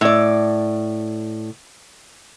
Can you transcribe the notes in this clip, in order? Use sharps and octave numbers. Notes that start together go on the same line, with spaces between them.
A2 D5